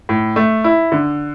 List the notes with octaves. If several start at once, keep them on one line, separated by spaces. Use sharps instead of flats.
A2
A3
E4
D3